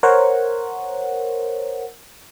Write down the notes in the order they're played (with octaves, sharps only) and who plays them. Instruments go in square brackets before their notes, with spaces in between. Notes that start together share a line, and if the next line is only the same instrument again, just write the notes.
[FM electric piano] A#4 C5 C#5 F#5